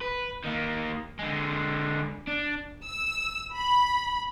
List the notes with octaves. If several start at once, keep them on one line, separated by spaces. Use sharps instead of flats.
B4
D#3 A#3
D3 G#3
D4
E6
B5